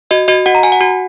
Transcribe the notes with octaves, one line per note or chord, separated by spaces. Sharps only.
F#4 D#5
F#4 D#5
F#4 F#5
A#5
F#4 G#5
F#5
F#4